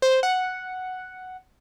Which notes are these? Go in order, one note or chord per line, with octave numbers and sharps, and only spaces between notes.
C5
F#5